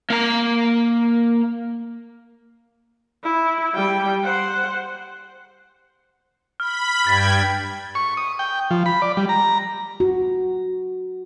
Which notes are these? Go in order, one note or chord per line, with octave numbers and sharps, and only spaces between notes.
A#3 A#5
E4
G3 G5
C5 F#5
B5 F6
G2 G5 F6 G#6 A6 B6
C#6
D#6
G5
F3
B5
D5
G3
A#5
F#4